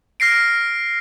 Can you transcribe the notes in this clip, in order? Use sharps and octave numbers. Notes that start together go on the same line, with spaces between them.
F6 A#6 C7 D7